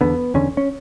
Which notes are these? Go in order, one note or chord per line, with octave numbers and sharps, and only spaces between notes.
E2 D3 B3
E2 D3 C#4
C#4